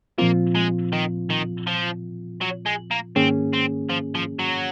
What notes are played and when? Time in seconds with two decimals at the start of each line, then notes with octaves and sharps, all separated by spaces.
0.18 A#2 F3 A#3 C4 F4
0.55 G#3
0.93 D#3
1.30 D#3
1.67 F3
2.41 F#3
2.66 G#3
2.91 A#3
3.16 G#2 D#3 A#3 C4 C#4 G#4
3.53 C4
3.89 F3
4.15 F3
4.39 F#3